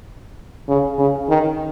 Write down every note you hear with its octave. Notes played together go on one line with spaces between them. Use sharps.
C#3
C#3
D#3